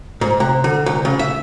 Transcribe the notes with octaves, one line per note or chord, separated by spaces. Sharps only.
G#2
C3
D3
C2
C#3
E5